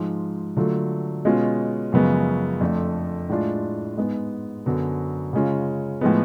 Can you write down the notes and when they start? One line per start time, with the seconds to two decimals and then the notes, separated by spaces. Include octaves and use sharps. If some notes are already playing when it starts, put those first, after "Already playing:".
Already playing: G#2 F3 G#3
0.56 D3 F#3 A3 F4
1.25 B2 G#3 C#4 F4
1.92 F#2 C#3 F3 G#3 B3
2.60 F2 F3 A3 D4
3.29 A2 G#3 D4 F4
3.98 G#2 G#3 B3
4.66 F#2 D3 F#3 B3
5.33 C#3 G#3 C#4 F4
6.01 A2 F3 G#3 B3